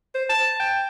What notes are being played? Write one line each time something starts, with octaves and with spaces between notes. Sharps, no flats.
C5
A5
G5